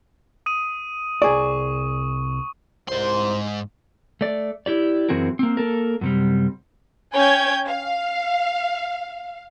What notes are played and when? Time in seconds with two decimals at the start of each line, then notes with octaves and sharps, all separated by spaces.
0.46 D#6 D#7
1.22 C2 G#4 D5 C#6
2.89 C2 G#2 C5 C6
4.21 A3 D5
4.66 E4 G4 D5
5.09 F#2 E3 C4 F#4 G#4 A#4
5.39 A#3 C4
5.57 A#3 A4 A#4
6.01 F#2 C3 G3
7.14 C#4 C#5 G5 G#5 G6 G#6
7.68 F5